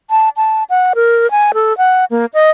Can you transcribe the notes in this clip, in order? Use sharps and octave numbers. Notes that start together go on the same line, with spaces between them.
A5
A5
F#5
A#4
G#5
A4
F#5
A#3
D#5